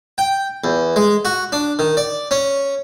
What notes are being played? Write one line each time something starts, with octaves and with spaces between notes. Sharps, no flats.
G5
E2
G#3
F#4
D4
D#3
D5
C#4